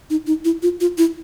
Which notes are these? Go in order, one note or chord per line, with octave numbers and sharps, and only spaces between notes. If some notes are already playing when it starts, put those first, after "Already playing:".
D#4
D#4
E4
F4
F4
E4